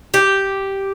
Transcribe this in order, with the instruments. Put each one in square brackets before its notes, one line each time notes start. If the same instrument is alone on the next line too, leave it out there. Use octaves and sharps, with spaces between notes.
[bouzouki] G4